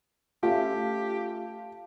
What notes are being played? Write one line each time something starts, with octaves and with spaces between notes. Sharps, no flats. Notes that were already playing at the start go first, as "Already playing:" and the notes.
A3 C#4 F4 G4 E5 F5 A5